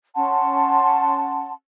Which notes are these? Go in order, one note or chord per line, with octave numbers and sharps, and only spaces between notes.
C#4 F#5 A5 C6